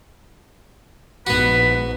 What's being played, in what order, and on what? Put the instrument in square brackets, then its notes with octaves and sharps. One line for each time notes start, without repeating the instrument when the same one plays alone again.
[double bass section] A#1 G#2 [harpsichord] B3 F#4 [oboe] B4